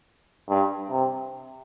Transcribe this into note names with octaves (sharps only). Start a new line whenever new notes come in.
G2
C3